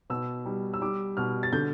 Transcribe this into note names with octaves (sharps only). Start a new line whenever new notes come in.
B2 E6
G3
E6
G3 D6
B2 F6
A6
D3 G6